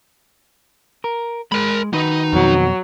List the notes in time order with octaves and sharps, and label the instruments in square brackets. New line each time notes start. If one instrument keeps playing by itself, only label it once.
[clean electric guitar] A#4
[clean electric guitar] G#3 [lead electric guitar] A#4 B5
[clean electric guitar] D#3 F#4 B4 [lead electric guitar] D#4
[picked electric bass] F2 B2 [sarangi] F#3